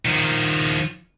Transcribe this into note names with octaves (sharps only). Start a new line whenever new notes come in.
D#3 F3